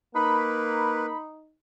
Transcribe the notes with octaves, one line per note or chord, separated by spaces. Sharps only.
A#3 D#4 B4 B5